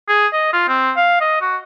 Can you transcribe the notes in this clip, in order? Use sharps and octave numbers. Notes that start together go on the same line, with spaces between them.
G#4
D#5
F4
C4
F5
D#5
F#4